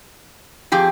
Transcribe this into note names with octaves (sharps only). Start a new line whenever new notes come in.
F2 G4 G#4 G5